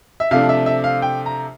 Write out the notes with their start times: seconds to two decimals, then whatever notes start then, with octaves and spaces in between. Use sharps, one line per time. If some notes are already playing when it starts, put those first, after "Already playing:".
0.20 E5
0.31 C3 F3 A3 D4 F5
0.49 E5
0.66 E5
0.84 F5
1.02 G5
1.26 A#5